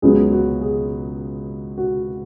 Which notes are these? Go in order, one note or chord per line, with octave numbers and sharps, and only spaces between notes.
C#2 C#3 F#3 B3 G#4
F#4
G#4
F#4